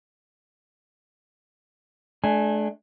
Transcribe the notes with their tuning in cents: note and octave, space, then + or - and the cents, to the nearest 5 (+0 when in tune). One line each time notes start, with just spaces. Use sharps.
A3 -40 D4 +0 G#5 +0